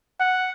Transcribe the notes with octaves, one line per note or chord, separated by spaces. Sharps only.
F#5